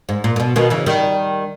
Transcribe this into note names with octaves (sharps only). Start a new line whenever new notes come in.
G#2
A#2
A#2
B2
B2 D#3
C#3 E3
D#3 G3